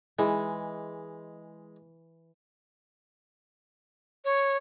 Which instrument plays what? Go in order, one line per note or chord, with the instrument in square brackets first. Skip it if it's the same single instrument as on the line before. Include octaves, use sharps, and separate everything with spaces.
[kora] E3 [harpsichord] G#3
[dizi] C#5